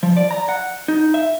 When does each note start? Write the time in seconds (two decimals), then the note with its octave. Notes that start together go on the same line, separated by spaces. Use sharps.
0.03 F3
0.17 D5
0.31 A#5
0.49 F#5
0.88 D#4
1.14 E5